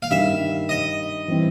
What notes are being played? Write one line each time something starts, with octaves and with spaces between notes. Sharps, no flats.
F5
G2 D#3 G3 E5
D#5
E3 G3 C4